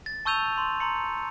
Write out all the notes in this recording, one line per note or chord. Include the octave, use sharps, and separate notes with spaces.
A6
A5 C#6 E6 G6 D#7 F7
C6
A#5 C6 C#7